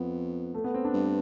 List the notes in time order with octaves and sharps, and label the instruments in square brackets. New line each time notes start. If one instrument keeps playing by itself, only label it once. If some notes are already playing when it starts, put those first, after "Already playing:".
Already playing: [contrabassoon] F2 [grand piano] B3
[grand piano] A3
B3
C4
D4
[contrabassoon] G2